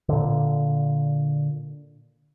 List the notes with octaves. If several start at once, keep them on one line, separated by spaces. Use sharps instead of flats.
A#2 D3